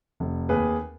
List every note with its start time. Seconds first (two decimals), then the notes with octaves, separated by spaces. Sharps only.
0.20 F1
0.49 D#2 G#4 B4